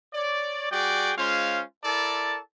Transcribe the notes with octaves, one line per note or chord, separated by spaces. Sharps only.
C#5 D5
G3 F#4 G#4 D5 G5
G#3 C#4 F4 C5 F5
E4 A4 A#4 D5 A5